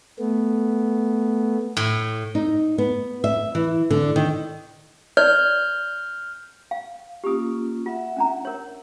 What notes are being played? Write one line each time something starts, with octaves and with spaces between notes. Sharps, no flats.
A3 B3
A2
D#4
B3
E5
E3
D3
D#3
D5 F6 G6
F5
A#3 C#4 F4 G4 D#6
F4 E5 F#5
C#4 D4 A#5
A#4 C#5